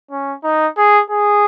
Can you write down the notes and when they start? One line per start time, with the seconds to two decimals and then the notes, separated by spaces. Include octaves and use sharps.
0.11 C#4
0.44 D#4
0.77 G#4
1.10 G#4